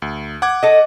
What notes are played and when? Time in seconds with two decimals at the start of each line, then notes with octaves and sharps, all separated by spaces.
0.02 D2
0.42 F#5 D6 G#6
0.63 A4 D#5